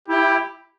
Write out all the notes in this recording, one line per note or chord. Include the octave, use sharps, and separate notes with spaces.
E4 G4